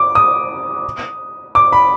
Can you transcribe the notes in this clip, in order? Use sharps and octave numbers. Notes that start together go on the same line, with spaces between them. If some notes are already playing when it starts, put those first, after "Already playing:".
Already playing: D6
D#6
D6
B5